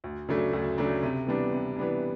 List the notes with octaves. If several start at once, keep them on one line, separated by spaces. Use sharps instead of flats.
D2
C#3 F#3 A3 D4
D2
C#3 F#3 A3 D4
C3
E3 G3 B3 D4
C3
E3 G3 B3 D4